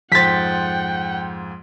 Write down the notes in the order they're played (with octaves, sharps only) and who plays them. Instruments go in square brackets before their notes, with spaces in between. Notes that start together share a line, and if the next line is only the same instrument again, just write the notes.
[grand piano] F2 G#2 C5 [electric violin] F#5 G5 [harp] A6 B6